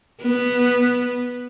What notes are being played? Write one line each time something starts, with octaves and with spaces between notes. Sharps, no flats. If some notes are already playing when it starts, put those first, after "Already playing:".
B3